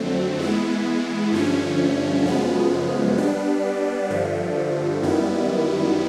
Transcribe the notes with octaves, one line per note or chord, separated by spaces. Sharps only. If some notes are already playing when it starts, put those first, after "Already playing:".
Already playing: F2 D3 F#3 A3 C4
E3 G#3 B3 E4
G2 D3 F3 A3 C#4
F#2 C#3 F3 G#3 B3
G3 B3 D4
G2 D3 F3 A3
F#2 D#3 G3 B3 E4